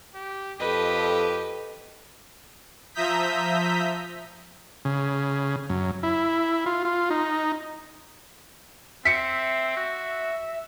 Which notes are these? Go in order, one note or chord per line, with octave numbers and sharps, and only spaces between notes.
G4
F2 G4 A4 B4 D#5
F3 E5 A#5 D#6 G6 B6
C#3
F#2
E4
F4
F4
D#4
C4 E5 B6 C#7
F#4